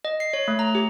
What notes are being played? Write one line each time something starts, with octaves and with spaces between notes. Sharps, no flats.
D#5
C7
C#5
A3
A#5
G4